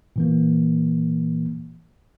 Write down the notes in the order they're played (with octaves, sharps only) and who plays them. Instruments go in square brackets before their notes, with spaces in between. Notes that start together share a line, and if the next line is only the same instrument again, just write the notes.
[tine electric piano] A#2 E3 A#3